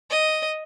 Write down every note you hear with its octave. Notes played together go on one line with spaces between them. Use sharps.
D#5